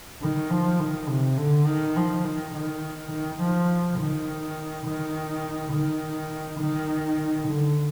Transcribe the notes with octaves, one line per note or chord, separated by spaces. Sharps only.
D#3
F3
D#3
C3
D3
D#3
F3
D#3
D#3
D#3
F3
D#3
D#3
D#3
D#3
D3